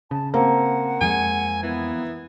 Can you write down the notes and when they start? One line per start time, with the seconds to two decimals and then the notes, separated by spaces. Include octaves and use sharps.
0.11 C#3 A5
0.34 A#3 C4 F#5
1.01 F2 F3 G#3 G#5
1.63 E3 B3